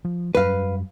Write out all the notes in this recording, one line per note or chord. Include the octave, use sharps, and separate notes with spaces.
F3
F#2 F#3 G3 B4 F5